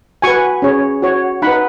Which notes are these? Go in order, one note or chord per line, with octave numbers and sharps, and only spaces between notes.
F#4 B4 G#5 C#6
C#4 G#4 C#5
F#4 C#5
D#4 F#5 B5
B4